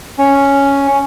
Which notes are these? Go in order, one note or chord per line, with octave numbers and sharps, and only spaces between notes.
C#4